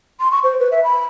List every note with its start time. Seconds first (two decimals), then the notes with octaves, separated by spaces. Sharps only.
0.20 C6
0.31 C#6
0.44 C5
0.60 B4
0.72 E5
0.84 B5